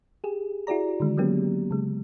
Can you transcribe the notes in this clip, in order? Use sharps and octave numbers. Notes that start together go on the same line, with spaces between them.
G4 G#4
E4 F#4 G#4 D5 A#5
D3 D#3 G#3
F#3 G#3 A#3 B3 C#4 G4
C#3 G#3